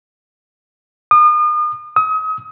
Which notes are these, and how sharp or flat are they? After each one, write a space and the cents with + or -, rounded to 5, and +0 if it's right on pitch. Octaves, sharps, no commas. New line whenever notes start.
D#6 -40
D#6 +35